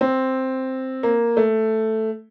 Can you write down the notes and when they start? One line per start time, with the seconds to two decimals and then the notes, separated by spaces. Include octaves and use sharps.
0.01 C4
1.03 A#3
1.37 A3